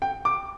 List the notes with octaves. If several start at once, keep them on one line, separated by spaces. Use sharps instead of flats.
G5
D6